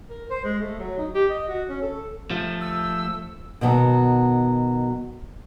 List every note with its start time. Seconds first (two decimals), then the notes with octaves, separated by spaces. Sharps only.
0.10 A#4
0.30 C5
0.44 G#3
0.60 A3
0.79 F#3
0.98 D#4
1.14 G4
1.30 D#5
1.48 F#4
1.68 C#4
1.82 A4
2.31 F3 A3
2.61 E6
3.61 B2 D#3 F#3 B3